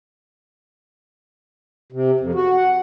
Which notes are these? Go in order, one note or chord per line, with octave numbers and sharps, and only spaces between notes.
C3
F2
F#4
F#5